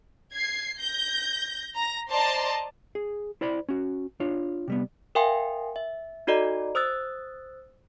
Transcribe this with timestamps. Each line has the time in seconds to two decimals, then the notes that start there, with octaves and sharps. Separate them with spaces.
0.34 G#6 C7
0.79 G6 A#6
1.75 A#5 A#6
2.09 C5 D5 D#5 A5 A#5 C6
2.95 G#4
3.41 E4 C5 D5 B5
3.69 C#4 F#4
4.20 D4 F4 C#5
4.68 C3 G3 B3
5.15 A#4 E5 F5 G5 G#5 C6
5.76 E5
6.27 D#4 F#4 A4 D5 D#5 A#5
6.75 C5 D#6 E6 F#6 A6